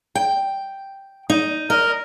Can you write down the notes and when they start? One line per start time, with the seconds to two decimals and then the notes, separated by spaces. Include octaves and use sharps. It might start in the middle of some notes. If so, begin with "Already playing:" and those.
0.15 G5
1.30 D#4
1.70 A#4 D#5